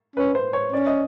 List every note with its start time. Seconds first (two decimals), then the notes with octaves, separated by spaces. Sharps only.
0.16 C#4 B4
0.35 C5
0.53 C#5
0.72 C#4 D5
0.87 D#5